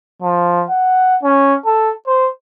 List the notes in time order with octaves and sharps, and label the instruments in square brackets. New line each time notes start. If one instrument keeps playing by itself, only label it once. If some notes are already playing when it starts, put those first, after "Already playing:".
[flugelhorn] F3
F#5
C#4
A4
C5